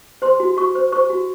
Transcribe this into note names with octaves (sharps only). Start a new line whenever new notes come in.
C5 C6
F#4
F#4 C#6
C5
C5 C#6
F#4